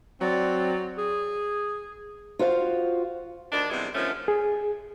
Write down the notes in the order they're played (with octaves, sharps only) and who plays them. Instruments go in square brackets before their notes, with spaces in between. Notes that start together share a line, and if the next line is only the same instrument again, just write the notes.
[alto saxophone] F#3 [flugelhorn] C4 [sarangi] D5
[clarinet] G#4
[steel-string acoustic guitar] F4 F#4 C5 F5
[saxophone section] D2 D#3 D4
C3 E3 G3 G#3 B3
D3 D#3 F3 A3 C#4
[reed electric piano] G#4